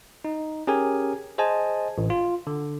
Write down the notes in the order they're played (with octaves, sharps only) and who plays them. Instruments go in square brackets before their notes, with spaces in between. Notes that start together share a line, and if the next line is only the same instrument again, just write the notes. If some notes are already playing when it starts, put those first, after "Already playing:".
[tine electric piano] D#4
C#4 G4 G#4 A#4 G#5
G#4 C5 D#5 G#5 A5
A1
F4
D3